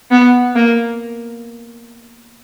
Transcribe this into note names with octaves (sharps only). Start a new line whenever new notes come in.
B3
A#3